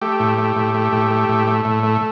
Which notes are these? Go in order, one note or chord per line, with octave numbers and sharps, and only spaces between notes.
A3 G4
A2
A3
A2
A3
A2
A3
A2
A3
A2
A3